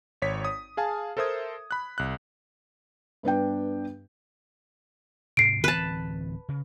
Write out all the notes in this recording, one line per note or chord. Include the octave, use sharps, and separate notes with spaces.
G#1 C#5 B6
D#6
G#4 F5 G#5 A5
A4 A#4 C5 E5 D#6 G#6
B5 F#6
C2 F#6
G2 B3 D4 G5
G#2 C3 C7 D7
D1 E3 C4 B4 A5
C#3